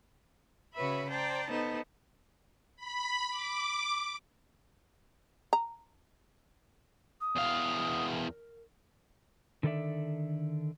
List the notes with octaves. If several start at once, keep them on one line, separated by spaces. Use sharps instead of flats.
C#3 F#4 B4 C#5 E5 B5
C5 D5 G5 A5 A#5
B3 D#4 A4 C5
B5
D6
A#5
D#6
E2 F5
A#4
D3 D#3 A4 C5 D5 E5